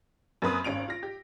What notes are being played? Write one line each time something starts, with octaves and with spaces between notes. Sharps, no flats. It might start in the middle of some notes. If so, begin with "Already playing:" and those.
F#2 A#3 C4 B4 D#6
G#1 C#4 D7 F7
F4 A#6
G4